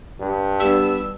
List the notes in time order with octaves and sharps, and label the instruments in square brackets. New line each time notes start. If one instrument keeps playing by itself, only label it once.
[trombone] G2
[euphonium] G3 [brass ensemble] B3 D4 [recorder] E6